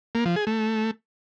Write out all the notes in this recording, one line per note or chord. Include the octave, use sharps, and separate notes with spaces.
A#3
F3
G#4
A3